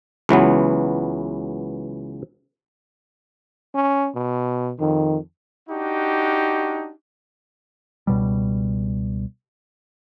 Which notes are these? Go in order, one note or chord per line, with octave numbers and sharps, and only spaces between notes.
C#2 E3 F#3 B3
C#4
B2
F2 D#3
D4 D#4 F#4 G4
C#2 B2 G3